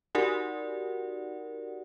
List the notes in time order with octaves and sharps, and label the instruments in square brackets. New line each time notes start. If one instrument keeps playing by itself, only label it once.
[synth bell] D#4 F#4 G4 A#4 D5 F#5